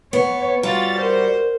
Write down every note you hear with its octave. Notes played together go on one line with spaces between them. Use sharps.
B3 C#5
G3 F4 F#4 A6
A#4 C5